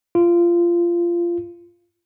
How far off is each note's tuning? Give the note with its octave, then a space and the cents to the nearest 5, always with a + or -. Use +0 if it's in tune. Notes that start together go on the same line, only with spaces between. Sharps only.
F4 -20